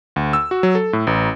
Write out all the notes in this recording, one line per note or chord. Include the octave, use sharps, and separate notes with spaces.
D2
E6
F#4
F#3
A4
A2
A1